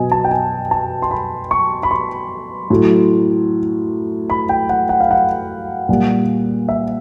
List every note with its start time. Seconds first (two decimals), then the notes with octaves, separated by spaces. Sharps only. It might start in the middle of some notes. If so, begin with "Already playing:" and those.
Already playing: B2 F#3 D#5 G#5
0.12 A5
0.24 G5
0.31 G#5
0.71 A5
1.02 C6
1.11 B5
1.51 C#6
1.83 B5
1.91 C6
2.70 A2 F#3
4.30 B5
4.49 G5
4.69 F#5
4.89 F#5
5.00 F5
5.11 F#5
5.89 A#2 G3
6.69 E5